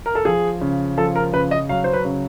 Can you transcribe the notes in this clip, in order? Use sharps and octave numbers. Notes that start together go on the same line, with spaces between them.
A#4
A4
F3 G#4
C#3
F3 A4
A#4
C#3 B4
D#5
F#3 F5
C5
B4
C#3